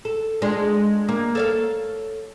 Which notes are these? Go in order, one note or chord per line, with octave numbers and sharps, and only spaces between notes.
A4
G#3 D4 F4
A#3
A4 C#5 F5